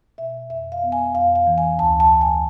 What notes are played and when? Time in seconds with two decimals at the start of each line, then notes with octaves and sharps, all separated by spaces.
0.18 B2 E5
0.50 F2 E5
0.72 F5
0.83 B3
0.92 G#5
1.15 F2 F5
1.35 F5
1.47 E3
1.58 G#5
1.78 D2 A5
2.00 A5
2.11 D2
2.21 G#5